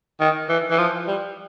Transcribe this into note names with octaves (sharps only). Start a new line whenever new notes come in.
D#3
E3
E3
F3
G3